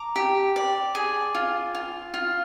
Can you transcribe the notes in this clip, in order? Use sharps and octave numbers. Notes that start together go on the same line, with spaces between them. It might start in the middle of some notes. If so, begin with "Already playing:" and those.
Already playing: A#5 D6
G4
D5
G#4
F4
F4
F4